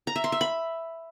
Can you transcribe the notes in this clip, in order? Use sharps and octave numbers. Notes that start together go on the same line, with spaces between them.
A#5
E5
C6
E5
B5